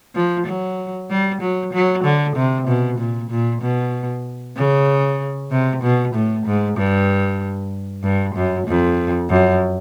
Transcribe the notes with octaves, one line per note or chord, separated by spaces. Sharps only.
F3
F#3
G3
F#3
F#3
D3
C3
B2
A#2
A#2
B2
C#3
C3
B2
A2
G#2
G2
G2
F#2
F2
F#2